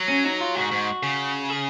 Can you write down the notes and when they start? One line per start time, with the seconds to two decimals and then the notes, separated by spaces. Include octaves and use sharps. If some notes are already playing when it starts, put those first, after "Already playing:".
Already playing: F#3
0.09 C#4
0.25 D#4
0.41 F4
0.55 G#2 F#4
0.72 G#2
1.03 C#3
1.50 G#4